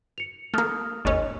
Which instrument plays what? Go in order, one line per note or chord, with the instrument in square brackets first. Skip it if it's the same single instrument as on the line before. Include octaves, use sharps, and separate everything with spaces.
[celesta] C#7 F7
[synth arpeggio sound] A3 A#3 [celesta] D#6 F6
[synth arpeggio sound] G#1 D#2 C#4 [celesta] D#5